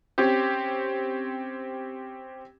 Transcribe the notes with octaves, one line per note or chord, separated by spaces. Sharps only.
C4 C#4 G4